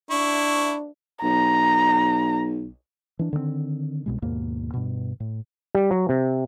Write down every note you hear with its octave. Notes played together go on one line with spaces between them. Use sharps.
D4 E4 C#6
B1 A#5
E3 D4
D3 D#3 A3 C4
C2 B2 G#3
D#2 G#2 B2 A#3
G2 B2
A2
G3
F#3
C3